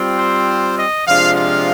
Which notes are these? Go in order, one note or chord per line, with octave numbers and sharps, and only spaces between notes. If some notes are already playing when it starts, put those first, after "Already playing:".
Already playing: G3 C4 F4
C5
D#5
C3 F3 G#3 D4 F4 F5
F5